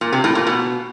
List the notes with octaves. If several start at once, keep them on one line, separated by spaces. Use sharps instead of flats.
A#2
C3
A2
A#2
B2